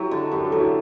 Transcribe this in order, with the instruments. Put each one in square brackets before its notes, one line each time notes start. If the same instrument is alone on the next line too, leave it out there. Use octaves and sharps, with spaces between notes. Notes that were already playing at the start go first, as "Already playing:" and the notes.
Already playing: [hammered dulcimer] F#3 [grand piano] E4 G4
[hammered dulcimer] D3
[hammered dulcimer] F#2 [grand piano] G4
[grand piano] A4
[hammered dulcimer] F#3
[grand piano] E4 G4